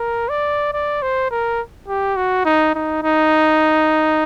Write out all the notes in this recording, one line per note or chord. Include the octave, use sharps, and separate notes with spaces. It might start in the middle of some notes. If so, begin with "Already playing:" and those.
Already playing: A#4
D5
D5
C5
A#4
G4
F#4
D#4
D#4
D#4